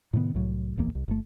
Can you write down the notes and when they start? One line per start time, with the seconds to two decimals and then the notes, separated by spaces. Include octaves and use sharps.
0.13 A2 C3 D#3 B3
0.35 C2 A2 F#3
0.77 D1 A#1 E2 A#3
0.95 C2
1.08 G1 A3